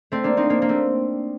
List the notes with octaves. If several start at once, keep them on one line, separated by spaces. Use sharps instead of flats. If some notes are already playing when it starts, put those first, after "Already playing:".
A3 C4
A#3 D4
C4 D#4
A#3 D4
A#3
A3 C4